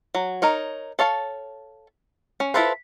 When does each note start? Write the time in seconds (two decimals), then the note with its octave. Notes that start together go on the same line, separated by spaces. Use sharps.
0.15 F#3
0.42 D#4 A#4 C#5
0.99 A4 C#5 F5 A5
2.40 C#4
2.54 E4 F4 A4 B4 C5